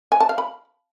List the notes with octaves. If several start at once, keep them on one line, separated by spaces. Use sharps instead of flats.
G#5
A5
F5
B5